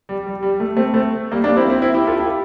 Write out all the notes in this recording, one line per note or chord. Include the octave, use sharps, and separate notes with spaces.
G3
G3
G3
A3
A3 C4
A3 C4
G3 A#3
A#3 D4
C4 E4
C4 E4
C4 E4
E4 G4
F4 A4
E4 G4